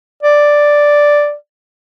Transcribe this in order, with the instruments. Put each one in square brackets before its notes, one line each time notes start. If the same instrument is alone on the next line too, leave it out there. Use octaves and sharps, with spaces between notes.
[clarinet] D5